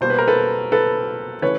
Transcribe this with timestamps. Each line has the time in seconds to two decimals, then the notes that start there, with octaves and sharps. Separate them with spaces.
0.01 B2 G3 A#3 C5
0.10 B4
0.19 A#4
0.28 A4 B4
0.72 A4 B4
1.42 C#3 E3 A3 B4 C#5